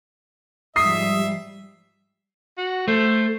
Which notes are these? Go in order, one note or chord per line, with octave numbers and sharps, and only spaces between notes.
G#2 F3 G3 E5 D#6 C7
F#4
A3 C5